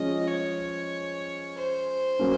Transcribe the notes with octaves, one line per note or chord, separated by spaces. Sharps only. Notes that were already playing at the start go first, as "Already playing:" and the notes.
Already playing: F3 G#3 C#4 D#5
C#5
C5
F#3 A#3 C#4